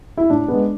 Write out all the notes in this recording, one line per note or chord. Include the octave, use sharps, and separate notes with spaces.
E4
A2 D4
G#3 B3